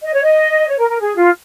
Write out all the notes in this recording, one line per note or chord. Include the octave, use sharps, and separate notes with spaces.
D#5
C#5
D#5
C#5
A#4
A#4
G#4
F4